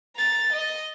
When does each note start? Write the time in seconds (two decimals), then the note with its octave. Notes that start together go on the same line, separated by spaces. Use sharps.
0.16 A#5 A6
0.53 D#5